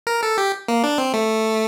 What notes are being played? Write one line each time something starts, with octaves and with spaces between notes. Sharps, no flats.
A#4
A4
G4
A#3
D4
C4
A3